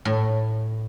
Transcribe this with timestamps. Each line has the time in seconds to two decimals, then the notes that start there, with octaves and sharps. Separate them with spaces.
0.05 A2